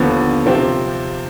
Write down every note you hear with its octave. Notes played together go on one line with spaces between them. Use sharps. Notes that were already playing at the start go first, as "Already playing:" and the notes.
Already playing: D#2 D3 F3 B3
C3 F3 C4 G4